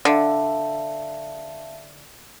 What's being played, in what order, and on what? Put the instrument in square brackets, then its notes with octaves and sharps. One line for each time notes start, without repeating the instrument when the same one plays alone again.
[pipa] D3 [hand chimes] E5 F5 A5